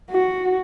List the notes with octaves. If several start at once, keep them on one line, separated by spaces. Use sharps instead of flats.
F#4